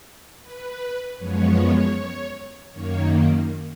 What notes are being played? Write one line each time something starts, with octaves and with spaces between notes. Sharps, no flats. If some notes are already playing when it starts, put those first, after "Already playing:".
B4
F#2 F3 G#3 B3 C#5
F#2 D#3 A#3 C#5